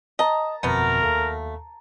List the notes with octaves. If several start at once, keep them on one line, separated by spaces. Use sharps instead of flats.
D#5 A5 A#5
G1 F2 B2 F#3 A3 B3 A#4
D#2 A4 F5